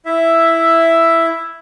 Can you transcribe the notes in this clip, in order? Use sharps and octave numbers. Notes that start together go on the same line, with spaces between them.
E4 E5